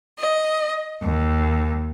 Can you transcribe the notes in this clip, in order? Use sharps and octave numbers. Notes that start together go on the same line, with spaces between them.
D#5
D#2